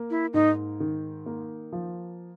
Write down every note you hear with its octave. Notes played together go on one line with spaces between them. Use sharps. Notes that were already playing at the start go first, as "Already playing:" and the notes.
Already playing: A#3
E4
G#2 D#4
D#3
A#3
F3